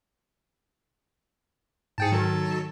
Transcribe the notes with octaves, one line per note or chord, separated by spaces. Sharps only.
G#2 G#4 G5 A5 A6 C#7
D#3 F#3 A4 A5